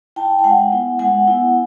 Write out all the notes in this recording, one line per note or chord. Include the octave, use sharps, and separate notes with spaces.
E4 G5 A5
G5
G#3 F#5 G#5
B3 E4
G#3 F#5 G#5
B3 E4